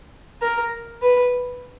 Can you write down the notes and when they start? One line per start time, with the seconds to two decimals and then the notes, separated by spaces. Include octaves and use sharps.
0.42 A#4
1.02 B4